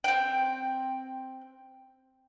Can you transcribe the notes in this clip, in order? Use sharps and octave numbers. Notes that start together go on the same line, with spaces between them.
C4 G5